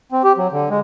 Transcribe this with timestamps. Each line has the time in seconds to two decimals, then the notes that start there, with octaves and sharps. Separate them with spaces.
0.12 C4
0.24 G4
0.38 F#3
0.52 D3
0.70 G#3